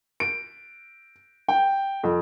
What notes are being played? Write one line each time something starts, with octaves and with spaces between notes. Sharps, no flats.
D7
G5
F2